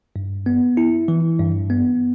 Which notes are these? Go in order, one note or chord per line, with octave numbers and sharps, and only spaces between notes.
G2
B3
E4
E3
G2
B3